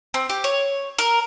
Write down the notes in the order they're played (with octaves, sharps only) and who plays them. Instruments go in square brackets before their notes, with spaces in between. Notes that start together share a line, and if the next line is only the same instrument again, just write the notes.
[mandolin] C4
G4
C#5
A#4